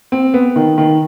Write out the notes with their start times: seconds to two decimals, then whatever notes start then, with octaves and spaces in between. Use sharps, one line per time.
0.12 C4
0.34 B3
0.56 D#3
0.78 D#3